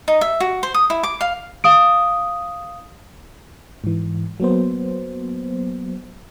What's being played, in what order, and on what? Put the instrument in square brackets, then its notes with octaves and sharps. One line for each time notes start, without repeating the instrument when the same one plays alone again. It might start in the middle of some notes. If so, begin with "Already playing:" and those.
[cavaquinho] D#4
E5
F#4
C5
D#6
E4
D6
F5
[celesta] F5 D#6 D7
[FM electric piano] G#2 E3
F#3 A#3 B3 C5